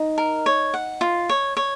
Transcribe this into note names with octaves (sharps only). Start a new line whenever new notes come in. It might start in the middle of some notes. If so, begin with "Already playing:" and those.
Already playing: D#4
A#4
C#5
F#5
F4
C#5
C#5